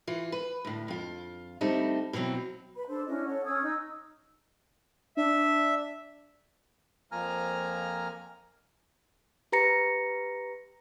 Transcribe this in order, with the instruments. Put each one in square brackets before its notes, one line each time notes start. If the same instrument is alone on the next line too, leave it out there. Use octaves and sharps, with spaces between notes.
[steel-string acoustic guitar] E3 F4
B4
D2 A2
F2 F4
D2 G3 A3 C4 D#4
B2 E3 F#3 C4
[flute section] B4 B5
D4 A4 C5
C#4 D4 E4 D#5
A4 C#5 F#5
C#4 D#6 E6 G#6
D#4 E6
[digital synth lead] D4 [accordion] E5
[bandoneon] F2 F3 A#3 G#5 A#5 F6
[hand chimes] G4 B4 A#5 A#6 C#7